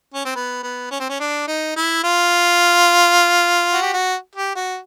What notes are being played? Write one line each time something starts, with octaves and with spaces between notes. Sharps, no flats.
C#4
C4
B3
B3
C#4
C4
C#4
D4
D#4
E4
F4
F#4
G4
F#4
G4
F#4